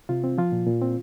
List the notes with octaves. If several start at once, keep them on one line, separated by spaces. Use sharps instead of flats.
C3 F4
C4
F3 F4
A#2
A#2
C4